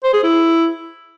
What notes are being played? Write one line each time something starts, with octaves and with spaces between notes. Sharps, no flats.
C5
G#4
E4